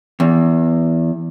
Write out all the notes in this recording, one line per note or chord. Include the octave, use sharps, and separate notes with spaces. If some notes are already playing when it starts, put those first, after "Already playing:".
E2